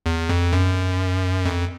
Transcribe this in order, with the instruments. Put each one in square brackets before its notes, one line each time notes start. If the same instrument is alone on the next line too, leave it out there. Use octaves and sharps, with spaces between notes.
[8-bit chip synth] E2
F2
F#2
F2